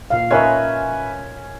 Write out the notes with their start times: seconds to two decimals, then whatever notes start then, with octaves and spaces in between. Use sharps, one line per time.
0.10 A#2 F5
0.31 C#4 A#4 B4 C#5 D#5 E5